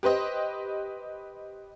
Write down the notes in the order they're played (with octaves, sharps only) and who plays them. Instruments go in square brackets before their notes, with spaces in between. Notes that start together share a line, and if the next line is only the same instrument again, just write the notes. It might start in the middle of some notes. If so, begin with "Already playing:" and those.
[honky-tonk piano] G4 B4 C5 D#5